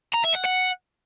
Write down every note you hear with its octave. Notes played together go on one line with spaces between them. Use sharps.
A#5
E5
F#5
F#5